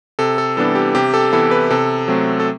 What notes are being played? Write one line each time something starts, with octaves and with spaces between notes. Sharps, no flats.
C3 A4
A4
E3 G3 B3 D4 A4
G4
C3 G4
A4
E3 B3 E4 A4
B4
C3 A4
F#3 A3 C4
A4